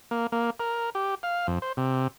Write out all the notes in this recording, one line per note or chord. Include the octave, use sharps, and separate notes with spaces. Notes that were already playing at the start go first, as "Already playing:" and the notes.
A#3
A#3
A#4
G4
F5
F2
C5
C3